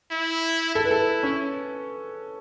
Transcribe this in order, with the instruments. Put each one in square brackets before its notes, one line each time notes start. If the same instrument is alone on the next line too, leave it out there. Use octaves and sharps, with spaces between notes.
[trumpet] E4
[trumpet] E4 [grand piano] A4
[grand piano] B4
A4
C#4